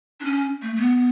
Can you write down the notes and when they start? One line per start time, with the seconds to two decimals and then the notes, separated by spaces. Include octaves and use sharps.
0.20 D4
0.25 C#4
0.62 A3
0.76 A3
0.80 B3